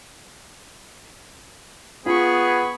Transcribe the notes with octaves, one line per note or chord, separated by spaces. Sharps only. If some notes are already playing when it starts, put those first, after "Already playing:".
B3 F4 G#4 B5 C#6